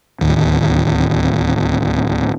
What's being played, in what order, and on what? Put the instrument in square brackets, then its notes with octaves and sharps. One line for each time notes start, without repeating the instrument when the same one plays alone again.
[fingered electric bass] D1 D#2